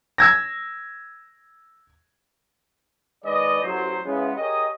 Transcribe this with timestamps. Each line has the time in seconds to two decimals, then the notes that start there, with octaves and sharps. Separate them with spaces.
0.18 E6 G#6 A#6
3.24 D#3 G#3 D4 B4 D5 D#5
3.63 A1 F#3 C5
4.05 C#3 E3 G#3 B3
4.37 G4 G#4 A#4 C#5 D#5